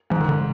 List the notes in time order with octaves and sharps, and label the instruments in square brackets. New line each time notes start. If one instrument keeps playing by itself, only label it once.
[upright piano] G#2 [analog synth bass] F3
[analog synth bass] D#3
D3